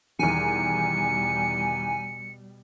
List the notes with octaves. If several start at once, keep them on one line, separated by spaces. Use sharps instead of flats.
E2 B2 D#3 G3 G#5 C#7